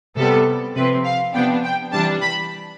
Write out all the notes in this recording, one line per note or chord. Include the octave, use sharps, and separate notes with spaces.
C3 G3 B3 A4
C3 F3 C4 B4
F5
C3 F3 B3 D4 G5
G5
C3 E3 G3 D4 A5
B5